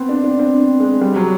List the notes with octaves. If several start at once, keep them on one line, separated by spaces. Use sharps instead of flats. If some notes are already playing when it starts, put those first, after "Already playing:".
Already playing: B3 C4
D4
D4
C4
G#3
G3
F#3